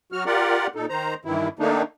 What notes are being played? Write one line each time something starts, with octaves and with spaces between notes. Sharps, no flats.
F#3 F#4 F6
F4 G4 A#4 D5 F#5
A#2 D#4 A4
D#3 C5 A#5
G2 D#3 E3 E4
D#3 A3 A#3 D4 D#4